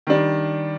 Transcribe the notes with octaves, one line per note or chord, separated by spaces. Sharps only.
D#3 G3 D4